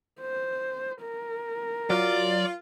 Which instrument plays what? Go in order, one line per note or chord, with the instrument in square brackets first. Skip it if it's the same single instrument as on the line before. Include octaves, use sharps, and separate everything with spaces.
[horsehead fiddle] C5
A#4
[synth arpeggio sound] F#3 [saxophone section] F4 [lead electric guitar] D5